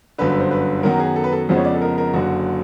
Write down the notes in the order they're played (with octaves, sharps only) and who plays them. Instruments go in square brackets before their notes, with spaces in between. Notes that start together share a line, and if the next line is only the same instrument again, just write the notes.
[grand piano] G1 F#2 D3 B4
B4
C5
B4
F#2 D#3 F#3 B3 A#4
G#4
A4
B4
A4
F2 C#3 F3 G#3 B3 C5
C#5
D5
A4
A#4
A#4
F#1 F#2 D3 F#4